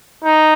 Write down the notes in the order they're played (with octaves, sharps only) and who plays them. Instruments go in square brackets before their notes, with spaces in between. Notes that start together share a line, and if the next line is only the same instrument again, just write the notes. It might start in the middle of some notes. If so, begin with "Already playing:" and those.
[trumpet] D#4